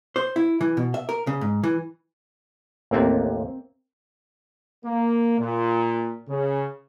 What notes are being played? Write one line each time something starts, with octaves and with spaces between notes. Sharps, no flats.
C5
E4
E3
B2
E5
A#4
C#3
G#2
E3
A1 D#2 A#3 C4
A#3
A#2
C#3